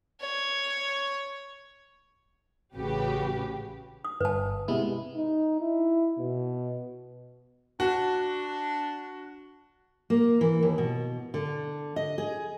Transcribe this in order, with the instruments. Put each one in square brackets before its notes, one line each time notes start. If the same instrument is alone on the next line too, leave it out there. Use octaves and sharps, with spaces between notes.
[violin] C#5
[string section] A1 C#3 F#4 G4 B4
[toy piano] D#6
[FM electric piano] G1 [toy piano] B4 A5
[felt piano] C3 B3 [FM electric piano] G#3 E4
[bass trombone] D#4
E4
B2
[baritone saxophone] D4 [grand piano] F#4
[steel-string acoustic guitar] A#3
E3
D#2
B2
D3
D#5
G#4